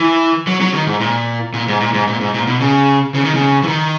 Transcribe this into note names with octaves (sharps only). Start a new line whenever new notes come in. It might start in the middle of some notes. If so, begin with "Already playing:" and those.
Already playing: E3
F#3
F#3
D#3
G#2
A#2
A#2
G#2
A#2
G#2
A#2
G#2
A#2
B2
C#3
C#3
D#3
C#3
E3
D#3